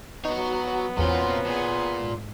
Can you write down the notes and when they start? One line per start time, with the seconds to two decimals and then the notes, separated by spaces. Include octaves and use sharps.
0.25 F#3 B3 D#4 C#5
0.97 G#1 E2 A#2 C4 C#4 F4 F#4
1.46 A#2 G#4
1.96 G#2